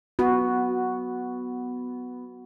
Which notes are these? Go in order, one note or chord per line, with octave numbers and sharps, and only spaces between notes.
B3 F#4